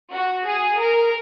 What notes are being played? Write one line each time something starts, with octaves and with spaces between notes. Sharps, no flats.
F#4
G#4
A#4